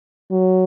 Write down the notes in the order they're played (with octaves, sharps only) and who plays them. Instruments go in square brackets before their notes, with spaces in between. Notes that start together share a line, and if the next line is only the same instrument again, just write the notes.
[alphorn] F#3